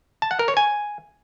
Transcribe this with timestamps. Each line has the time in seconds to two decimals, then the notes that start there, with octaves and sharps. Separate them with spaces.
0.22 A5
0.31 F#5
0.39 A#4
0.48 C#5
0.57 G#5